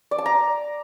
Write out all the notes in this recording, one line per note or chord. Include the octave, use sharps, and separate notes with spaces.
D5
A5
A#5